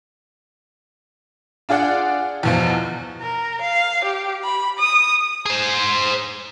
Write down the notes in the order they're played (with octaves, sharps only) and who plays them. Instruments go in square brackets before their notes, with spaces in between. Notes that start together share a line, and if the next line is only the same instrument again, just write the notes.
[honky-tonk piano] D4 F4 G#4 D5 F#5
E2 B2 F3
[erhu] A#4
F5
G4
B5
D#6
[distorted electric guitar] G#4 C5